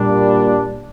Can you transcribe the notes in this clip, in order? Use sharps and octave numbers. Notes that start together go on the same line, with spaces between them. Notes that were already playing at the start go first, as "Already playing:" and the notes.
Already playing: A#2 G3 A#3 D4